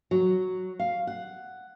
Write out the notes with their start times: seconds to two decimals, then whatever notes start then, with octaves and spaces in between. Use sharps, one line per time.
0.11 F#3
0.79 F5
1.07 F#5